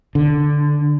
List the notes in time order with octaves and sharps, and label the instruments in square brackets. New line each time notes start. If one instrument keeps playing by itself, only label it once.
[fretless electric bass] D3